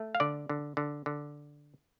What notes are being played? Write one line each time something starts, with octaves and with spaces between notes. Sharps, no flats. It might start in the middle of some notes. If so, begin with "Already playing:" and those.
Already playing: A3
F5
D3 D5
D3
D3
D3